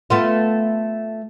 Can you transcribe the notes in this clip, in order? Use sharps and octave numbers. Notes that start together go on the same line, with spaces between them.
A3 B3 F4